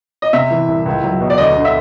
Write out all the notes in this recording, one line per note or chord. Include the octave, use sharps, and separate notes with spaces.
D#5
C3 E5
E3
C2
C#2
F#3
B2
D5
D2 D#5
D3
E5